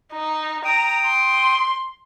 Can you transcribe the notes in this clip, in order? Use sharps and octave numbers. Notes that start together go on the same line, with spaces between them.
D#4
G5 A#5 D#6
C6